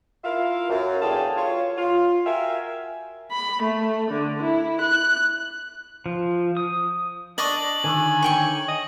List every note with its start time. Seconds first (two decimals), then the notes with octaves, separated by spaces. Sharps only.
0.24 E4 F4 A#4 E5 F5
0.70 F#2
1.02 E2 D3 G4 G#4 F5 A5
1.35 F4 C#5
1.77 F4
2.26 F#4 A#4 E5 F5 G5 G#5
3.31 B5
3.61 A3
4.10 D3
4.41 E4
4.81 F#6
6.06 F3
6.57 D#6
7.38 D4 D5 D#5 C#6 F#7
7.84 D3 D#3 G#5
8.22 C#5 G5 C#6
8.68 D#5